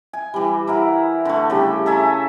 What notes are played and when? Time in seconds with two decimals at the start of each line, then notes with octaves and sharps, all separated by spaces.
0.13 G#5
0.34 E3 G3
0.67 E4 A#4 F#5
1.25 D3 A3
1.50 C#3 G3 G4
1.86 A4 E5 G#5 A#5